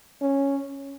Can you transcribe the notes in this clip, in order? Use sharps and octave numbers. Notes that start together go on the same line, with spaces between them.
C#4